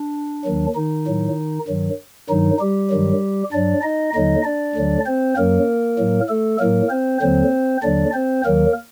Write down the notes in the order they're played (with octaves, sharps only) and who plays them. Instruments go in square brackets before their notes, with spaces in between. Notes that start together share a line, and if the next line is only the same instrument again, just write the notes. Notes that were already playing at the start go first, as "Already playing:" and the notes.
Already playing: [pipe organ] D4
D#2 D#3 F#3
D#3 D#4
A2 F#3
G2 D#3 F#3
G2 D#3 F#3 D#4
G3 G4
G2 D#3 F#3
G2 F#3 D4 D5
D#4 D#5
D#2 D3 F#3 D#4 D#5
D4 D5
D2 D3 F#3
C4 C5
F#2 F#3 A#3 A#4
A2 F#3
A3 A4
A2 F#3 A#3 A#4
C4 C5
D#2 D3 F#3 C4 C5
D#2 D3 F#3 D4 D5
C4 C5
D#2 D#3 F#3 A#3 A#4